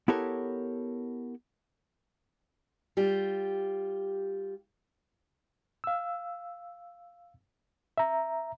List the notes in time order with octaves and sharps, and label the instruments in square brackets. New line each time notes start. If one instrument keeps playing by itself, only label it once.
[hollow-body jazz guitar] B3 E4 G4 A4 A#4 C#5
[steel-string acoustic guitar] G3 F4 G4
[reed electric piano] F5 E6
E5 A#5